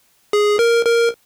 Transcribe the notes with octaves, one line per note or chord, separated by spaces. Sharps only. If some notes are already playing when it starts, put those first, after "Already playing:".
G#4
A#4
A#4